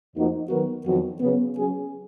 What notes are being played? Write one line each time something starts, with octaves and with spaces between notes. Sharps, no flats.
F2 F3 A#3 D#4 F#4
D#3 F#3 B3 F#4 A#4
F2 D#3 F#3 B3 F#4
C#3 F#3 B3
F#3 C#4 G#4